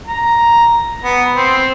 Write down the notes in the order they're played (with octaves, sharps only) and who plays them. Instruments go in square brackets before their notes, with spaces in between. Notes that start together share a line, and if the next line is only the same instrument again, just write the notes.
[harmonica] A#5
B3
C4